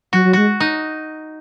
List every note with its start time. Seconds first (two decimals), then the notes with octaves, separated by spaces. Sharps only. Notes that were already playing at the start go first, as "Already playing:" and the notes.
0.13 F#3 F#4
0.25 F#3
0.33 G#3 F#4
0.60 D#4